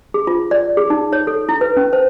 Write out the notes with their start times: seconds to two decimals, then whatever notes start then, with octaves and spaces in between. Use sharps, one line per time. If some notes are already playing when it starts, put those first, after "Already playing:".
0.14 G#4
0.27 F4
0.51 D5
0.77 G#4
0.90 D#4
1.13 C#5
1.27 A4
1.49 E4
1.61 B4
1.77 C#4
1.93 C5